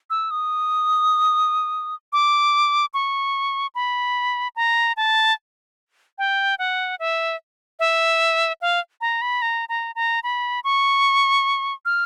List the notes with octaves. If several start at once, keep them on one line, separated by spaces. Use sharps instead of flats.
E6
D#6
D6
C#6
B5
A#5
A5
G5
F#5
E5
E5
F5
A#5
B5
A#5
A#5
A#5
B5
C#6
F6